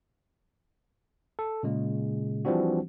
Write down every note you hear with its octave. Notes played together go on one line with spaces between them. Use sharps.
A4
A#2 C#3 G#3
E3 F3 G3 C4 D4 F#4